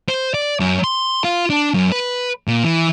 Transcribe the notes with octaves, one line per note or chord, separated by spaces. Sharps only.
C5
D5
F#2
C6
F4
D4
F#2
B4
A#2
E3